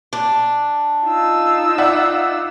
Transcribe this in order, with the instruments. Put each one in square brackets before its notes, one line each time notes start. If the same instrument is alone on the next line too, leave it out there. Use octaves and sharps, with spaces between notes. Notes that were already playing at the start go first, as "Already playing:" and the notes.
[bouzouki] D4
[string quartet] D#4 F4 E6
[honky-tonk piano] D5 E5 F#5